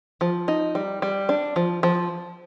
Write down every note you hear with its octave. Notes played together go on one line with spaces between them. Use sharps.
F3
D#4
G3
G3
D4
F3
F3